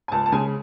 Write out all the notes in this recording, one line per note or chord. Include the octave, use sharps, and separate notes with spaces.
G#5
C#2 A5
A5
C#3 G#3 G#5